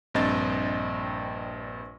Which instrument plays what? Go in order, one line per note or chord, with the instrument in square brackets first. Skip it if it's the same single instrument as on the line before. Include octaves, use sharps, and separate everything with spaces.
[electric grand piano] A#1 G2 C4 D#5 A6